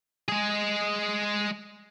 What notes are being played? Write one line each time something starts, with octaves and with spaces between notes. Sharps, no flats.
G#3 G#4